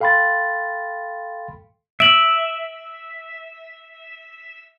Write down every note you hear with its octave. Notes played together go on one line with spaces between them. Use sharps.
A4 F5 G5 B5 C6 A6
E5 D7 F#7